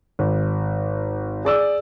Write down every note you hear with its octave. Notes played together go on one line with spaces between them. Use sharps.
G#1
G#4 D5 E6